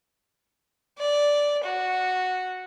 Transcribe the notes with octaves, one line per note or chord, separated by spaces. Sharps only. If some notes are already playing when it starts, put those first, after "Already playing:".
D5
F#4